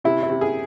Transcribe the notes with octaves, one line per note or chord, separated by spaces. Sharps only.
C3 E4
E4
C3
G#4